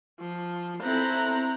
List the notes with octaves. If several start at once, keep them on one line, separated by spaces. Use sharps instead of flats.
F3
C4 E4 A4 A#5 F#6 G6